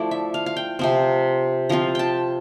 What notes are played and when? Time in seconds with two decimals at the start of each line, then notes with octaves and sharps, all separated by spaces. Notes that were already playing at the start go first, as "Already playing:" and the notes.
Already playing: F3 A3 E4 D5
0.11 E5
0.34 F5
0.46 F5
0.57 G5
0.79 C3 F3 C4
1.69 F3 C4 F4 A#5
1.95 G5 A5